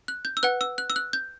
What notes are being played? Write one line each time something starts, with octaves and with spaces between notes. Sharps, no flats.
F#6
G6
E6
B4 F#5 F#6
E6
F#6
E6
F#6
G6